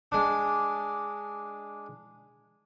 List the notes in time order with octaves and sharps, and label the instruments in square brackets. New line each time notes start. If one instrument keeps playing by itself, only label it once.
[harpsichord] G#3 D4